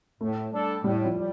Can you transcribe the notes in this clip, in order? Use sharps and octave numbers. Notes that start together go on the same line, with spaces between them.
A2 A3
G3 D4 A4
A2 G3
F3
G3